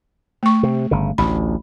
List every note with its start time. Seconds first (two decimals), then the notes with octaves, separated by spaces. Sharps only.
0.43 A3 C#6
0.63 C3
0.91 G1 C#3
1.18 A1 D2 B5